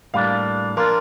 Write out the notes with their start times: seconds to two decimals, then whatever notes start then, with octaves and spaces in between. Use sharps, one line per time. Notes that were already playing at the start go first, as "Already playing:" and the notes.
0.14 A2 G3 A#3 D4 F5
0.77 F3 A#3 D4 F4 A#4